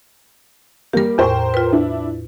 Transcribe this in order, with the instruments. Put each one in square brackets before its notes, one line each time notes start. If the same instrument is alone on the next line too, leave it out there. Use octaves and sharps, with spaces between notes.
[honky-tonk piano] G3 A#3 [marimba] G4 A#4
[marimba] E2 A2 [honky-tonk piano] A#4 C5 G5
[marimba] F4 B4
[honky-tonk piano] D4 E4